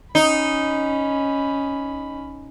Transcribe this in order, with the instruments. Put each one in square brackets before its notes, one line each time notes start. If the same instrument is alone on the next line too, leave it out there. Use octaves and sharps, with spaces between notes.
[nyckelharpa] C#4 B5 [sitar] D#4